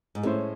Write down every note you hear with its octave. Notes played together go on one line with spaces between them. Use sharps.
G#2
A2 G#3 C#4 E4 C5